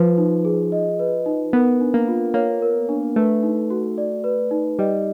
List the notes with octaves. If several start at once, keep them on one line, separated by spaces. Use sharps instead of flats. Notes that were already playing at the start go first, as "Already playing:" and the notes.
Already playing: F3 B4
D#4
G#4
D#5
B4
D#4
B3 A#4
D4
A#3
F4
A#3 C#5
A#4
D4
A3 B4
D#4
F#4
D5
B4
D#4
G3 D#5